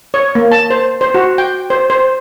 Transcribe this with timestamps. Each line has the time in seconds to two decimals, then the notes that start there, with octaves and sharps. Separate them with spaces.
0.14 C#5
0.35 A#3
0.52 A5
0.70 C5
1.01 C5
1.14 F#4
1.38 G5
1.70 C5
1.90 C5